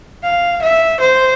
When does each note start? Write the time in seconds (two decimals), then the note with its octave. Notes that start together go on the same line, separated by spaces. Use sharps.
0.23 F5
0.62 E5
1.00 C5